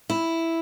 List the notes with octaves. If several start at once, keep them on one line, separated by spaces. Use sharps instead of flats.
E4